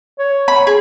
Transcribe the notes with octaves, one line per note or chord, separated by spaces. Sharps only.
C#5
B5
G#4